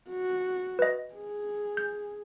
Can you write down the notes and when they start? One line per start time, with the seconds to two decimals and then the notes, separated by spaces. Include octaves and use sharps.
0.10 F#4
0.79 B4 D#5
1.15 G#4
1.77 G6